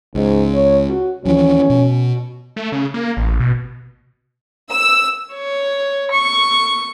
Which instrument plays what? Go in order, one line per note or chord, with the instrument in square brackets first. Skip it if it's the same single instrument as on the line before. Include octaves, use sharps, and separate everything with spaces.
[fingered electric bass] C#2 [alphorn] G#2
[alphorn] C#5
F#4
[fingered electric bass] D#2 E3 F3 [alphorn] C#4
[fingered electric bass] B2
[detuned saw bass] A3
C#3
A#3
A1
B2
[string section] E6
[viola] C#5
C#6